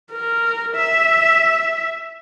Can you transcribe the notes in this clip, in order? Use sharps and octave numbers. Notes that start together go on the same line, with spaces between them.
A#4
E5